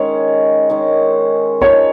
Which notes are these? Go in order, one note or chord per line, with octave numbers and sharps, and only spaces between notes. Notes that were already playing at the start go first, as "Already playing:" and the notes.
Already playing: D#3 G#3 C#4 C#5
D#3 G#3 C#4
F3 G#3 D#4 C#5